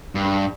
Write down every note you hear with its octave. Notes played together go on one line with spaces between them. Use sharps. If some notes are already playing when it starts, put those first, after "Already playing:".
G2